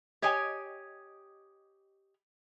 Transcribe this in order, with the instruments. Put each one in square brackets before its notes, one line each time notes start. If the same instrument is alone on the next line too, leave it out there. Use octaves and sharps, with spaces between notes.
[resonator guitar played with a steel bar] G4 C#5 D#5 G5 G#5